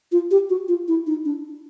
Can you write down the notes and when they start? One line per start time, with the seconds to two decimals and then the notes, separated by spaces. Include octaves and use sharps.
0.12 F4
0.31 G4
0.49 F#4
0.68 F4
0.88 E4
1.07 D#4
1.25 D4